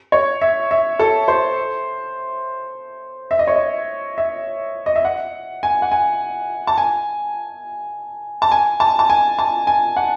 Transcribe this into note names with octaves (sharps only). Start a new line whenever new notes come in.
C#5
E5
E5
A4
C5
E5
D#5
C#5
D#5
E5
D#5
E5
F#5
G#5
F#5
G#5
A5
G#5
A5
G#5
A5
A5
G#5
A5
G#5
F#5